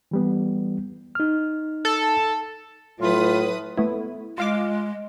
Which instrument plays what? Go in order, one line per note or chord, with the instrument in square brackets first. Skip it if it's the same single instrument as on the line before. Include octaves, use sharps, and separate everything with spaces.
[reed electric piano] E3 G3 B3
D#4 F6
[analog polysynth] A4
[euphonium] A2 [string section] F#3 B4 D#6 [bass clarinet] F4
[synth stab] A3 B3 E4
[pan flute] G#3 [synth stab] F4 F5 D6